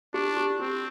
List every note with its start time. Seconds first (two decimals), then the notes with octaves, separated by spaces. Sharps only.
0.14 D4 G4
0.37 G4
0.60 C4 G4